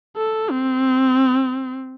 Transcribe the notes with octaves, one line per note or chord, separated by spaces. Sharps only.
A4
C4